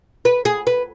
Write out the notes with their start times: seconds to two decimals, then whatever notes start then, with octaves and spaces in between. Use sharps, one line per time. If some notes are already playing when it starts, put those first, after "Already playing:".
0.25 B4
0.45 G#4
0.67 B4